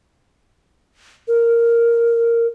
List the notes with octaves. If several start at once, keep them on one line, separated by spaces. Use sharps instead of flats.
A#4